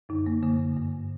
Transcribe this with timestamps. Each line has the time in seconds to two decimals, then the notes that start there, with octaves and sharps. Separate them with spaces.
0.09 F#2 D3 D#4
0.26 A#3
0.43 F#2 D3 A#3
0.77 G2 D3